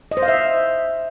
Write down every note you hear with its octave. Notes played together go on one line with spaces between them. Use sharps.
D#5
C5
F5
E5